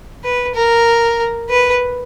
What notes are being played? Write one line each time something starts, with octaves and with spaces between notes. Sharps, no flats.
B4
A#4
B4